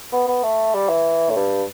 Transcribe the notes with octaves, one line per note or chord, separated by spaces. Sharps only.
B3
B3
A3
G3
E3
A2
G2